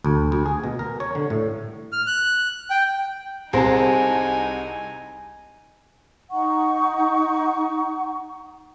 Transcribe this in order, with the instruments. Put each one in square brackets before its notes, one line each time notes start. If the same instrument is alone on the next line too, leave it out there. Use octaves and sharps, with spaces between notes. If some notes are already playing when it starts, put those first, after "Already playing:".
[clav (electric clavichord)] D2
D2
G#4
B2
A#4
C#5
D3
A2
[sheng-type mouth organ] F6
F#6
G5
[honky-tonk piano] C2 A5 [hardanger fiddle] D#4 G#5 [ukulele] G#4 A#4 C5
[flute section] D#4 F#5 C#6